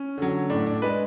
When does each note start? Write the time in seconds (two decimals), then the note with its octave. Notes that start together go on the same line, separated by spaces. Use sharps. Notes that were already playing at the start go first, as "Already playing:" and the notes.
Already playing: C#4
0.18 D3 F#3
0.50 A2 D4
0.67 D4
0.82 G#3 B4